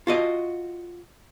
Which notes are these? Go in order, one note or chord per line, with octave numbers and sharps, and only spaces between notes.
F4 F#4 D#5